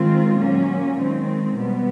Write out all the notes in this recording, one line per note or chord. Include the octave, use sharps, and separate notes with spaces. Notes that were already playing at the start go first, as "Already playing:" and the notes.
Already playing: D#3 G#3 C4 F4
A#2 F#3 A#3 C#4
D#3 G#3 C4
B2 G3 B3